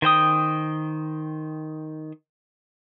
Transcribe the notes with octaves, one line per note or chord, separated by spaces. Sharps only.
D#3 C5 G5 D#6